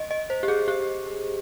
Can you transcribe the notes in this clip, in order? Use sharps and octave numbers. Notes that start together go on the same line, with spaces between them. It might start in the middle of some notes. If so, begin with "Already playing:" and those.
Already playing: D#5
D#5
C5
G4
G#4
G4